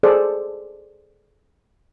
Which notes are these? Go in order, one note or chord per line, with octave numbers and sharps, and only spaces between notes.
G#4 A4 C5 D5